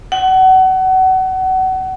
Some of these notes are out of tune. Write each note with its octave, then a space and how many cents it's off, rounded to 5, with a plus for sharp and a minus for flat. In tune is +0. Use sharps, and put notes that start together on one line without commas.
F#5 +30